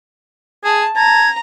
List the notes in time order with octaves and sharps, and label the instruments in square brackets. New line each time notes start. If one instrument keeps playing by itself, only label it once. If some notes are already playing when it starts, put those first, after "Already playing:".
[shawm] G#4 [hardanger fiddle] A5
[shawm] A5 [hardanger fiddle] A#5 [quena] G#6